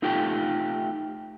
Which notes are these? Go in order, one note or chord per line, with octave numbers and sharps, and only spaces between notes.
A3 D#4 F4 G4 A4 G5